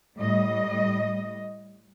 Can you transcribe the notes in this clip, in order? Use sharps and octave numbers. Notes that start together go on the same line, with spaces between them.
A2 G3 D#5